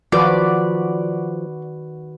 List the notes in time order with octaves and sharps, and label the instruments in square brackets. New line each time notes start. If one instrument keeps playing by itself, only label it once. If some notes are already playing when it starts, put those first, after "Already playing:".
[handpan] D#3 F#4 B4 [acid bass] F3 [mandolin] D5